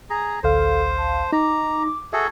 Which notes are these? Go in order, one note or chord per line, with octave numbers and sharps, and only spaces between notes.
G#4 A#5
A1 D2 A4 C5 F5
A5
D#4 A#5 D6
F#4 G#4 A4 E5 G#6